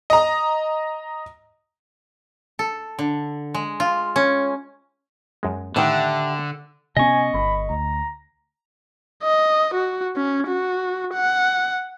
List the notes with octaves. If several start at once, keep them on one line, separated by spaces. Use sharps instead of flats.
D#5 A#5
A4
D3
G#3
F4
C#4
F#2 G#3
A2 D3 D#3 G4 E5 F#5
C3 B3 C#4 D#5 G#5 C#6
G1 B5
D2 A#5
D#5
F#4
C#4
F#4
F#5